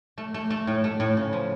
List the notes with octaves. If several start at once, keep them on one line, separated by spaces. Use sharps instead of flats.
A3
A3
A3
A2
A3
A2
C#3
F3